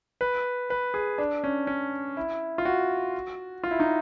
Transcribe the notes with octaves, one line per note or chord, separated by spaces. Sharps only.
B4
B4
G#4
D4
C#4
C#4
E4
F4
F#4
F4
E4
D#4